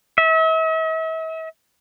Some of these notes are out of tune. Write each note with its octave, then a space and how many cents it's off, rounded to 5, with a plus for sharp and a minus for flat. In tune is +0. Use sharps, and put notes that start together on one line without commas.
E5 -40